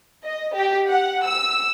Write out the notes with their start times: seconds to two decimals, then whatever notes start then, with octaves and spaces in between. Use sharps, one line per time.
0.24 D#5
0.55 G4
0.88 F#5
1.25 E6